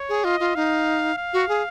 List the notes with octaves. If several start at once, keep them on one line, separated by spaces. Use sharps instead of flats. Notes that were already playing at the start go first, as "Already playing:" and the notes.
Already playing: C#5
G#4
F4 D#5
F4
D#4 F5
F5
F#4
G#4